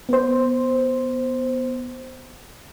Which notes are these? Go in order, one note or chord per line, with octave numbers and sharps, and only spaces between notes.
B3 C5